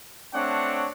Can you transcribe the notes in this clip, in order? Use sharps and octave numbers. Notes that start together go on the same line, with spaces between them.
A3 C4 D4 C#5 F#5